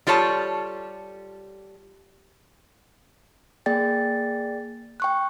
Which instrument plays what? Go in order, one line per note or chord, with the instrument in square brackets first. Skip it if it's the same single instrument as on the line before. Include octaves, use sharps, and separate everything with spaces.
[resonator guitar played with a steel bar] G3 F4 A4 C#5 A5
[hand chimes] A#3 G#4 D5 G5 A6
G5 C#6 F#6